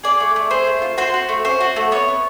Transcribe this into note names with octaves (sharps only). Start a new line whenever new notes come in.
G#4 D5
A3
A3
G#4 C5
A3
F4
F#4 C5
F#4
A3
C#4 C5
F#4
A3
B3 C#5
B3